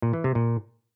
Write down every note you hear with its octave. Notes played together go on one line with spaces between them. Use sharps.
A#2
E3
C3
A#2